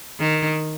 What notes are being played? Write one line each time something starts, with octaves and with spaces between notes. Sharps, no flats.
D#3